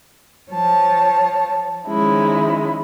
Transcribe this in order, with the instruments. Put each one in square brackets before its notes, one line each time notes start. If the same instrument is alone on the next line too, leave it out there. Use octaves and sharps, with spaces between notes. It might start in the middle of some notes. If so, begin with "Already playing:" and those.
[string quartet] F3 C#5 A5
D#3 F3 G#3 C#4 E4